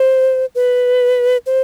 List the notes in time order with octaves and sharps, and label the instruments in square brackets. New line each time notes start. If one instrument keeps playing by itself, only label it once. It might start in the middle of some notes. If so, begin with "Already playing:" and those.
Already playing: [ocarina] C5
B4
C5